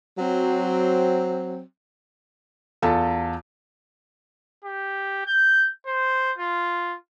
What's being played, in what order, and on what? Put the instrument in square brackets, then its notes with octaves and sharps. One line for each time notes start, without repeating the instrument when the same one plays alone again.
[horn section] F#3 C4
[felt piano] E2 F4 A4
[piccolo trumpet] G4
G6
C5
F4